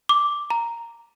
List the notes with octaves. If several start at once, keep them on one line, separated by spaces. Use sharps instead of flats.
D6
A#5